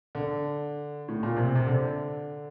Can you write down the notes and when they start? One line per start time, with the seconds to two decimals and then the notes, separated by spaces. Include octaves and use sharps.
0.15 D3
1.08 A2
1.23 A#2
1.36 C3
1.55 C3
1.66 D3